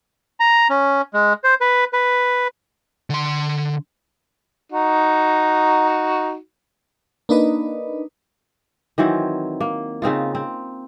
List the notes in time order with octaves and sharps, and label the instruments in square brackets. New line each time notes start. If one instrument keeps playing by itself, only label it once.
[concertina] A#5
C#4
G#3
C5
B4
B4
[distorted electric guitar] D3 C6
[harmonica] D#4 F#4
[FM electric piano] A#3 D4 D#4 B4 D#5
[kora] D#3 E3 F#3 C4
A#3
C#3 C4 D#4 F4
C4